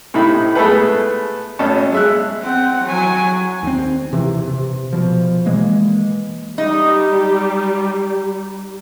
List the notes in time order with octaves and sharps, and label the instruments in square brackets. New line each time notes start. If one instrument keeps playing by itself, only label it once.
[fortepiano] A2 C3 D#4 E4 B5
G#3 A3 B3 G#4 A4 B4
G#1 A3 C#4 A5
G#3 E5 F#6
[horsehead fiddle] C4 F#5
F#3 G#5
[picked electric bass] D#2 C4
C3 E3
C3
B2 F3
E3 G#3 A#3
[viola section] G3 G4 [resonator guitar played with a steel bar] D#4